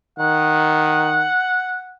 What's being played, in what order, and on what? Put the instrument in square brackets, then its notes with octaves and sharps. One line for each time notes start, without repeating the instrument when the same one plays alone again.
[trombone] D#3 [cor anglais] F#5